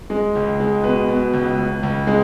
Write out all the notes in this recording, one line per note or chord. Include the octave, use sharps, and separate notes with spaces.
G#3
C#2
G#3
B2 B4
B2
C#2
C#2
C#2
G#3